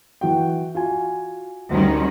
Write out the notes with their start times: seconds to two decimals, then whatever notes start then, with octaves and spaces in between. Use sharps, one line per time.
0.21 E3 F#4 G5
0.75 F4 F#4 G#5
1.71 D2 D#3 G3 C#4